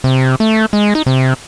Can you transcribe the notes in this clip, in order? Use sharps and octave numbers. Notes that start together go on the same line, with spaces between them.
C3
A3
G#3
D#4
C3